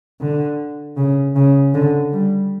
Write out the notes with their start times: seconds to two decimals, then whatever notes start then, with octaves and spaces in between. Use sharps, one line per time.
0.21 D3
0.97 C#3
1.36 C#3
1.74 D3
2.13 G3